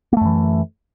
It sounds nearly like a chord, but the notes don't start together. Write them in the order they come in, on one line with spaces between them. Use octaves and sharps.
A#3 A3 F#2 E3